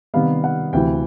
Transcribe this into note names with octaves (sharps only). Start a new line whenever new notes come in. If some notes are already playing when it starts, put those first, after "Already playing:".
C3 D#3 G3 B3 F5
F#5
D2 C3 E3 G5